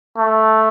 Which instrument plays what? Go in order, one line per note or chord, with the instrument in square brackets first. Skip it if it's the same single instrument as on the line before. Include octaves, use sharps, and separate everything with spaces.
[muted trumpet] A3